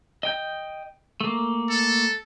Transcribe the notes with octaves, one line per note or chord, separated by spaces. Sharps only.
D#5 G5 G6
A3 A#3
A4